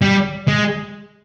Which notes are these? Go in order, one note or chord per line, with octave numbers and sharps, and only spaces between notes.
G3
G#3